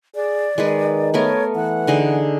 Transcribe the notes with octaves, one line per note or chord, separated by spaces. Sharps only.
G#4 D5
D#3 G#3 G#4 B4
A3 B3 A#4 C#5
E3 F#5
D3 D#4 G#4